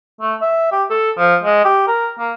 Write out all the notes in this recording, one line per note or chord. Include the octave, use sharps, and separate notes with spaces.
A3
E5
G4
A4
F3
G#3
G4
A#4
A#3